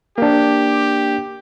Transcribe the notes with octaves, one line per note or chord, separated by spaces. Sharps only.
A#3 D4 G4